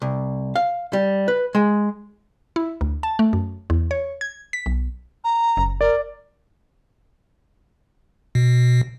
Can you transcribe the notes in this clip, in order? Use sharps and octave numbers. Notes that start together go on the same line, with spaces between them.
C2
F5
G3
B4
G#3
E4
D2
A5
A3
F#2
E2
C#5
G#6
B6
B1
A#5
F#1
A#4 D5
B2